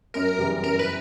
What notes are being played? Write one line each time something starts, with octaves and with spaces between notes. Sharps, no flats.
F#2 A#4
C#3 E3 G3
F#2 A#4
B4